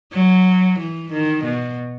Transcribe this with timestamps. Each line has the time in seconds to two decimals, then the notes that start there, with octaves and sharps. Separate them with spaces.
0.13 F#3
0.79 E3
1.12 D#3
1.45 B2